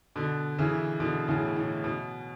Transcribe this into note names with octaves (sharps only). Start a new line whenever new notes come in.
B2 D3
C#3 E3
B2 D3
A2 C#3
A2
B2